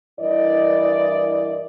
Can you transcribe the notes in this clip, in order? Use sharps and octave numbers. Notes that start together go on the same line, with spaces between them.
G2 E3 E4 A#4 D5 D#5